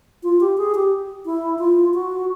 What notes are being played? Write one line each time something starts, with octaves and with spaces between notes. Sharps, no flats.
F4
G4
G#4
G4
E4
F4
F#4